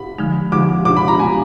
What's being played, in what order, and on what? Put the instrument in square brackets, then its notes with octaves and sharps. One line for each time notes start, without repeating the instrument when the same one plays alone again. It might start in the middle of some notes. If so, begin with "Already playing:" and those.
Already playing: [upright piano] B5
[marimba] D3 F3 G#3 D#4
[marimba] D3 F3 G#3 D#4 [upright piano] D6
[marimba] B2 G#3 D4 [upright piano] D6
[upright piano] B5
A#5
[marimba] B2 G#3 D4 [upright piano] G#5